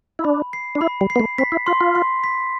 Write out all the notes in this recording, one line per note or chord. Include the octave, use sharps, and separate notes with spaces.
E4
D4 B5
C7
D4
E4 B5
G3
C7
B3
A3
C4 B6
E4
F4 C6
F4
C6
B6